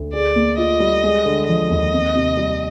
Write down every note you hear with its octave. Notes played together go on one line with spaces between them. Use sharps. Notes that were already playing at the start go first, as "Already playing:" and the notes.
Already playing: D2
G#4 D5
A#3
F4 D#5
G3
G#3
D3
F3 D#5
D#2
C4
C3
G3